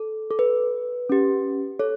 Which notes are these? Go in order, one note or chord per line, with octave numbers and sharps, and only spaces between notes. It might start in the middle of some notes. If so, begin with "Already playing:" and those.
Already playing: A4
A4
B4
C#4 G4
A4 C#5